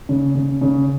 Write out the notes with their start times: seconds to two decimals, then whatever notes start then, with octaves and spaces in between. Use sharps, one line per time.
0.09 C#3
0.35 C#3
0.61 C#3